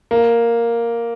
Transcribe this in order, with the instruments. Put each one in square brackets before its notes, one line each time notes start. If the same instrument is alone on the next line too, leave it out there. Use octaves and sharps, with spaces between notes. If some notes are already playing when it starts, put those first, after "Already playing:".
[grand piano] A#3